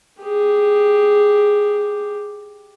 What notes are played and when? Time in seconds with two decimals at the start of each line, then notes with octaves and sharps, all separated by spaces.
0.20 G4 G#4